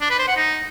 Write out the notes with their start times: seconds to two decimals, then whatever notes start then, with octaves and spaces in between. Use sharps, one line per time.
0.01 D4
0.10 B4
0.19 C5
0.28 F#5
0.37 D#4